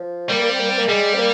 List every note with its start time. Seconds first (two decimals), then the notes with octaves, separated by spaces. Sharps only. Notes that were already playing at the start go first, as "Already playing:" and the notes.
Already playing: F3
0.29 G3 A#3
0.39 A#3
0.50 C4
0.60 A#3
0.69 C4
0.78 A#3
0.88 G3 G#3
1.14 C4
1.18 A#3